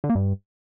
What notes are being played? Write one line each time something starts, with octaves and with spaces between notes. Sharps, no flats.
D3
A#3
G2